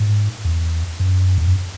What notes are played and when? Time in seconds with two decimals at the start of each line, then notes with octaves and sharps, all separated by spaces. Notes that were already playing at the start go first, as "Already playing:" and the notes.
Already playing: G#2
0.45 E2
1.00 F#2
1.38 E2
1.47 F#2